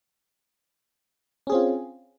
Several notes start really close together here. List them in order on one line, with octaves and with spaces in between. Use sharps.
C#4 G#4 C4 F4